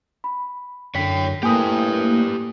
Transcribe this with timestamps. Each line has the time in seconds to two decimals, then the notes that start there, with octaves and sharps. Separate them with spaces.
0.24 B5
0.95 F#2 D3 C#5 G5 B6
1.43 A2 A#3 G4 B4 G5 G#5 D#6